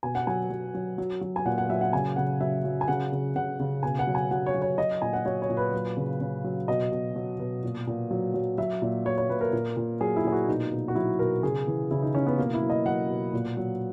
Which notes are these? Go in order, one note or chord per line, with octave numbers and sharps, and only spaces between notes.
B2 G#5
F#5
F#3 G#5
F#3
F#3
F#3
F#3
G#5
A#2 F#5
F#5
F#3 E5
F#5
C#3 G#5
C#3 F#5
F#3 E5
F#3
G#5
C#3 F#5
C#3
C#3 F#5
C#3
B2 G#5
F#5
F#3
G#5
F#3 F#5
C#5
F#3
C#5
F#3 D#5
A#2 G#5
F#5
F#3 C#5
C#5
A#2
B4
F#3
C#3
C#3
F#3
B2 D#5
B2
F#3
B2
A#2
A#2
F#3
F#3
F#3 E5
A#2
F#3 C#5
C#5
A#2 B4
A#4
A#2
A#2
F#3 G#4
E4
A#2 G#4
F#4
B2 D#4
B2
F#4
F#3 E4
B2 A#4
C#3 G#4
E3
C#3 E4
D#4
E3 C#4
B3
B2 A#3
E4
F#3
D#5
F#3 F#5
B2
A#2
F#3